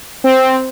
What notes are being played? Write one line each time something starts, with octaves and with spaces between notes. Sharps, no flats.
C4